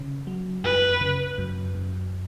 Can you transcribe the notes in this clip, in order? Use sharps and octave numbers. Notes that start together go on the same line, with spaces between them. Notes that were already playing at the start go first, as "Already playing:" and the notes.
Already playing: C#3
F#3
F#2 B4
C#3
F#2
F#2